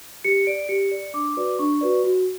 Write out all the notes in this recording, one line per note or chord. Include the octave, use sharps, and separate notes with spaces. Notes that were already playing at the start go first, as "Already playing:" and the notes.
G4 C#7
D5 D7
G4 C#7
D5
D4 D6
F#4 B4 D5
D4 C#6
F#4 B4 D5
F#4